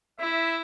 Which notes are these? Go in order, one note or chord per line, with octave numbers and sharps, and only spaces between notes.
E4 E5